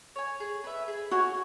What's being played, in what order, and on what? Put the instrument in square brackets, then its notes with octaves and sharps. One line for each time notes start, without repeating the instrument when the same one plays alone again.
[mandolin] C#5 G#5
G#4
B4 E5
G#4
[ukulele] F#4 [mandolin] C#5 G#5